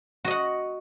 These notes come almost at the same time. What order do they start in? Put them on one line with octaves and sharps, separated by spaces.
F#4 D#5 F#5